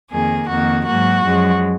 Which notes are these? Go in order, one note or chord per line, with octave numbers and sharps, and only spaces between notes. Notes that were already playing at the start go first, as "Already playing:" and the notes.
F2 D#3 A#3 G#4
F2 D#3 A#3 F#4
G#2 F#3 A#3 F#4
F#2 F3 G#3